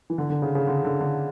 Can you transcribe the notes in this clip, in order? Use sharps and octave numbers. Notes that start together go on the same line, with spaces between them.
E3
D3
D3
C#3
C#3
D3
D3
D3